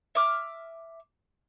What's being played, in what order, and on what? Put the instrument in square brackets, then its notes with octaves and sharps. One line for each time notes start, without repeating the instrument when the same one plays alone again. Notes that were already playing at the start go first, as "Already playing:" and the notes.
[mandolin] E5 D6 F6